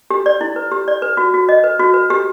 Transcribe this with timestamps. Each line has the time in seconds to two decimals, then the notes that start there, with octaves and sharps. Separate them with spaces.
0.10 G4
0.26 D5
0.41 E4
0.56 B4
0.72 G4
0.88 D5
1.02 B4
1.17 F#4
1.34 F#4
1.49 D#5
1.64 B4
1.79 F#4
1.94 B4
2.10 G4